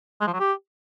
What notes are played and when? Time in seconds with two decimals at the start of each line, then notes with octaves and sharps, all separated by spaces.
0.21 G#3
0.27 F3
0.33 F#3
0.40 G4